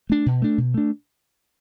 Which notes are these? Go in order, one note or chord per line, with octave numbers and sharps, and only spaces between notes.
A3 D4
B2
A3 D4
B2
A3 D4